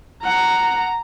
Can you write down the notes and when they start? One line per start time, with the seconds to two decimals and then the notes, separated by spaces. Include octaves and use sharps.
0.23 F#5 A#5